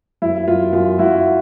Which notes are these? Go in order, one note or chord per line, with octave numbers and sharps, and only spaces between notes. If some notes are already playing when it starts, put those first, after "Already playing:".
F#2 E4
F#2 F4
F#2 F4
F#2 E4 F#4